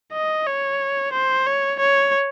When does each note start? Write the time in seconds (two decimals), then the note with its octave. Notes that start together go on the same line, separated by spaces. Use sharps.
0.13 D#5
0.46 C#5
1.13 C5
1.46 C#5
1.79 C#5